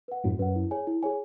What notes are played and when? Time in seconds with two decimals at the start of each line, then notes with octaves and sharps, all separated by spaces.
0.08 B4 F#5
0.24 F#2 A2 F#4
0.39 F#2 B4 F#5
0.56 E4
0.71 G#4 C#5 G#5
0.87 E4
1.03 G#4 C#5 G#5